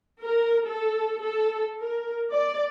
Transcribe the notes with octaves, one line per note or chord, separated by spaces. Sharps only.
A#4
A4
A4
A#4
D5